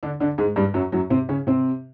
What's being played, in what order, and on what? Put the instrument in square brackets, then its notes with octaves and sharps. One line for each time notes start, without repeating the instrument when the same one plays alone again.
[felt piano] D3 D4
D3 D4
G#2 G#3
G2 G3
F#2 F#3
F#2 F#3
C3 C4
C#3 C#4
C3 C4